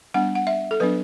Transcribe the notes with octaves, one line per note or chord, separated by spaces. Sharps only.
G3 B3 D4 F#5
F#5
E5
A4
F#3 B3 D4 B4